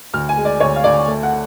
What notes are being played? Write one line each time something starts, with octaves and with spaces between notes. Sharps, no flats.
D2 F6
G#5
G#3
D5
D2 C#5
F5
D2 D5
A3
F#5